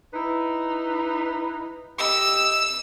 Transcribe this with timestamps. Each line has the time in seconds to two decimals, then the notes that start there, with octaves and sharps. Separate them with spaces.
0.13 D#4 E4 B4
1.98 G4 D#5 E6